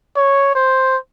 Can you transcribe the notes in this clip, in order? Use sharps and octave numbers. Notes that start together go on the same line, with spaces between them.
C#5
C5